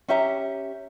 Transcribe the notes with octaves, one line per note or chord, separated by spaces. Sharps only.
C#4 G4 E5 A#5